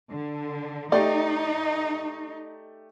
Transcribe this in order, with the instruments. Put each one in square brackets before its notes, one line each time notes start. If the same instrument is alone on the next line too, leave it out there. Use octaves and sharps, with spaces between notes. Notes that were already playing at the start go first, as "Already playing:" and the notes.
[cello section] D3
[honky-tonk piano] A3 G4 D5 [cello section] D#4